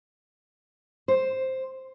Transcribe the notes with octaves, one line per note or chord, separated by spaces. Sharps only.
C5